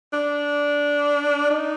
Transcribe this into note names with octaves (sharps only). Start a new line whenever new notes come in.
D4
D#4